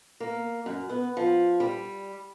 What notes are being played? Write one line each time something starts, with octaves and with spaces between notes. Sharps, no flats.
A#3
F#2
B3
F3
G3